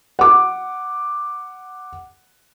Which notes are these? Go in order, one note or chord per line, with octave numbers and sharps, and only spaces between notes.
F#5 D6